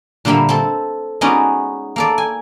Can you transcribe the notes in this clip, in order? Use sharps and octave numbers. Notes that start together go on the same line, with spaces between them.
A#2 D3 G3 A#3 E5 B5
C4 A4
G#3 B3 C#4 D#4 F#4 D5
A#3 A4 D5
G#5